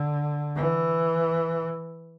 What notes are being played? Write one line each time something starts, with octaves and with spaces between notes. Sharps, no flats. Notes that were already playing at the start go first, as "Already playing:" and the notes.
Already playing: D3
E3